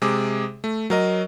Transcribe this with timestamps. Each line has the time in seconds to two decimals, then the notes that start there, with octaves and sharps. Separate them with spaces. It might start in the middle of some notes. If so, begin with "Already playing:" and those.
0.02 C3 G#3 G#4 D6
0.64 A3
0.90 F#3 A#4 D#5